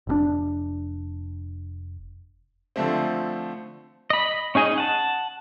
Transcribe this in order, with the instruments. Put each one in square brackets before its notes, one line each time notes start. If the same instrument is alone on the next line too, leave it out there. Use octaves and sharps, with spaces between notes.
[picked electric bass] F1 A2 D4
[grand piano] D3 F3 A3 C4
[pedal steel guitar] D#5 B5
C#4 D#4 G#4 D#5
F#5 A5